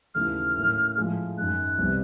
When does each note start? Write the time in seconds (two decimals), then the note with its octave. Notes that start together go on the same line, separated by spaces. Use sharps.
0.15 D#2 C#3 E3 A3 F6
0.55 A2 F#3 A#3 C#4
0.97 A2 F3 G#3
1.38 F#2 D#3 G#3 F#6
1.78 C2 B2 G3 C4